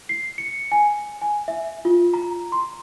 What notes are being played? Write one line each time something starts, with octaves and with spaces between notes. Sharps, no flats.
C7
C#7
G#5
G#5
E5
F4
A#5
C6